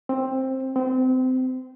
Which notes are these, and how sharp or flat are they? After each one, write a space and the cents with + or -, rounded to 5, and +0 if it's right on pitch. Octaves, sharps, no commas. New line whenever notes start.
C4 +15
C4 -25